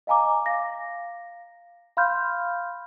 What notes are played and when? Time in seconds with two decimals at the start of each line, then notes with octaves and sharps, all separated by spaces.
0.07 D#5 F5 G#5 A#5 D6
0.46 F5 A#6
1.97 F5 B5 C6 F6 G6